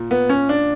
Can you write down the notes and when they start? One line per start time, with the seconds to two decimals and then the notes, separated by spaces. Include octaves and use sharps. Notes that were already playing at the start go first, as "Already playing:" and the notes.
Already playing: A#2
0.11 B3
0.29 C#4
0.49 D4